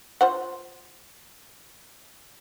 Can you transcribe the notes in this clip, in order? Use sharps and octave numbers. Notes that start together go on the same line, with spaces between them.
F4 C5 F#5